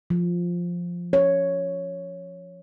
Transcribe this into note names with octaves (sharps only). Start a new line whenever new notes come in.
F3
C#5